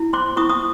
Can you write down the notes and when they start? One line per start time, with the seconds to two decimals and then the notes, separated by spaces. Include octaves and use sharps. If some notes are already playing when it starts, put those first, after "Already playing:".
Already playing: E4
0.13 C5 C6 D6
0.36 E4 C#6 D#6
0.50 D#6